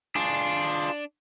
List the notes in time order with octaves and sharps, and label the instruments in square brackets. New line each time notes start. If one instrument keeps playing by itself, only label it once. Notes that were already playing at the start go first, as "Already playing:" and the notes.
[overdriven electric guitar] D4 [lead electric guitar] F4 G#4